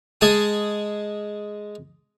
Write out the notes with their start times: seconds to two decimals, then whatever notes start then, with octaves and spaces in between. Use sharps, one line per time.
0.21 G#3 G#4 G#5 A5 D#6